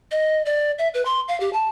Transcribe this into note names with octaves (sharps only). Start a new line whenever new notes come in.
D#5
D5
E5
B4
C6
F5
G4
A5